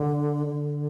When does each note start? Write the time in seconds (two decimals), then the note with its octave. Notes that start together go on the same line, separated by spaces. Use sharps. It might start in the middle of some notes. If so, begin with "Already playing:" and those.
Already playing: D3
0.46 D3